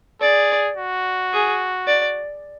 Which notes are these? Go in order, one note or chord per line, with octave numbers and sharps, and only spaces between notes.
G#4 D5
F#4
G#4
D5